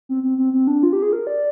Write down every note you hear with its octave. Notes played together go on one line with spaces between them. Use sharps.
C4
C4
C4
C4
D4
F4
G4
G#4
A#4
D5